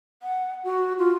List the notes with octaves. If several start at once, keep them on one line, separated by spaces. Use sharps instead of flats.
F#5
F#4
F4